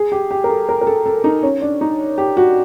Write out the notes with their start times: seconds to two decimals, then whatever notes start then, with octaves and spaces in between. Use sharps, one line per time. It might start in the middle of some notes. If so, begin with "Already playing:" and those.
Already playing: G#4
0.12 G4
0.31 G4
0.44 A#4
0.50 A4
0.69 A#4
0.81 A#4
0.87 A4
1.06 A4
1.24 D#4
1.43 C#4
1.62 D4
1.81 D#4
2.18 G4
2.37 F#4